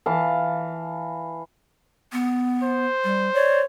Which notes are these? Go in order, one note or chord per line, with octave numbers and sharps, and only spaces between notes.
E3 F5 A5
B3
C5
G3
C#5 D5